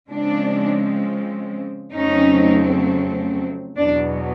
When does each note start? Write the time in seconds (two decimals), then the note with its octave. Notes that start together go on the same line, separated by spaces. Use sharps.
0.11 C#3 F3 G#3 C4 D4
1.94 F2 C#3 F#3 A3 C4 C#4 D#4
3.78 E2 B2 F#3 D4